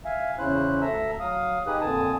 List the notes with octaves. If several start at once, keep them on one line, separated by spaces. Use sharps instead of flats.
E5 F5 G#5
E2 C#3 C#4 E4 C5 F#6
D2 A4 E5 A#5 E6
F#3 F5 D#6
D#4 G4 G#4 B4 D#6 F#6
F2 A#2 D3 G#5 A5 D#6